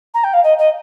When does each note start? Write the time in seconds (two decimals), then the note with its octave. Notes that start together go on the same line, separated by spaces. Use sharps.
0.14 A#5
0.24 G5
0.34 F5
0.44 D#5
0.59 D#5